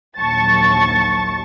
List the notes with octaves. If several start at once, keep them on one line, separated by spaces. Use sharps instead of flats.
A#1 D#2 F#3 A5 C#6 A6